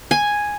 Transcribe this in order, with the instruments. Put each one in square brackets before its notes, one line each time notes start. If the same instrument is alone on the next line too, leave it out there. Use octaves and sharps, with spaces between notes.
[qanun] G#5